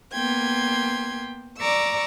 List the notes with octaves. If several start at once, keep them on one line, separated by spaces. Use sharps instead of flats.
A#3 B3 G5 C6 G#6
D5 A#5 C#6 D6 E6